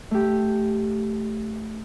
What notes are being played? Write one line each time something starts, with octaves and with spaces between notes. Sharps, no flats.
A3 G4